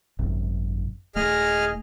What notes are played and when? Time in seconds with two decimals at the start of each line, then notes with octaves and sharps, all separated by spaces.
0.19 G#1 F#2 C3
1.16 D#1 A3 G#4 D#5 F6